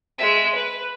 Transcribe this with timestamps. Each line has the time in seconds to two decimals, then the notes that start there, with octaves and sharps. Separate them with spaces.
0.18 G#3 E5
0.55 B4